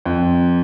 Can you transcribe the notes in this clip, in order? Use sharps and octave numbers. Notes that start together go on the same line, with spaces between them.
F2